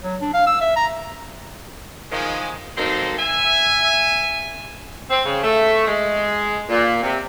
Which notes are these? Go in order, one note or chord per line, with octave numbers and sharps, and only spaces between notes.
F#3
D4
F5
E6
E5
A#5
D#3 F3 G#3
D#3 F#3 A#3 C4 A4 C5
E5 G#5
C4
C#3
A3
G#3
A#2
C3